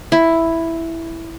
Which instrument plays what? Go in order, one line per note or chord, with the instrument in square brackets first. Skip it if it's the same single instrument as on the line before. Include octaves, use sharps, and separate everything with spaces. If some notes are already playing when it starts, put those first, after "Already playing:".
[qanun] E4